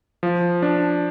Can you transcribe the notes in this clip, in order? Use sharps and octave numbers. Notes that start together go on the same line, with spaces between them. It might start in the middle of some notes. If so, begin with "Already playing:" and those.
F3
D4